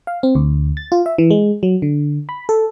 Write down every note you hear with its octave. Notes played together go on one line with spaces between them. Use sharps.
F5
C4
D2
A6
F4
E5
E3
G#3
F#3
D3
B5
A4